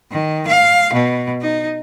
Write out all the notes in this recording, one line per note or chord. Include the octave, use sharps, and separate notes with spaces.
D#3
F5
B2
D#4